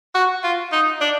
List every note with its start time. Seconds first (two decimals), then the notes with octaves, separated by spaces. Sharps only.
0.15 F#4
0.44 F4
0.72 D#4
1.01 D4